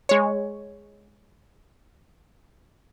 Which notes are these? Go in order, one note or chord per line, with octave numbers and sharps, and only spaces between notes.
G#3 C#5